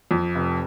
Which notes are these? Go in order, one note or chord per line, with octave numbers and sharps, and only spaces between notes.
F2
F1